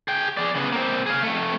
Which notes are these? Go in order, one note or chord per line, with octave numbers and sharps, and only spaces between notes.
G#4 G5
G#4 D5
C#3 B3
A#3 C4
G#4 F5
F2 A3